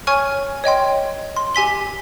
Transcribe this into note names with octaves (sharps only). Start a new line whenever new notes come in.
C#5 G#5 C#6 F6
C#5 D#5 G5 C6
C6
G4 G#5 B6 G7